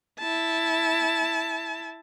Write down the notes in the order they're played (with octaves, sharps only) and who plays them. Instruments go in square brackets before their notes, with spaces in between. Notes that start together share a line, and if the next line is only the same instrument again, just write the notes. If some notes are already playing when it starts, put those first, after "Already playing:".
[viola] E4 A5